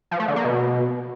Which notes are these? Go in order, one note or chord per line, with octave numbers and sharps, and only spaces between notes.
F3
A3
D3
A#3
B2